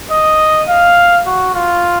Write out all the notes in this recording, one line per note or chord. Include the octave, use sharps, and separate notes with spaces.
D#5
F5
F#4
F4